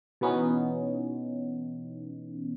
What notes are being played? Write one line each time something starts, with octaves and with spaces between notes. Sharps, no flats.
B2 E3 B3 C#4 D#4